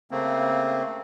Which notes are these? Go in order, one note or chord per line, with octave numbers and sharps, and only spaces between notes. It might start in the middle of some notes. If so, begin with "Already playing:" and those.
C#3 A3 A#3 C4